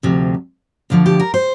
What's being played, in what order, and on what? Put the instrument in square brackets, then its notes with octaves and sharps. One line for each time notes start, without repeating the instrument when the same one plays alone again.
[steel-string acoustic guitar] D2 C3 F3
D2 D3 F3
G4
A#4
C5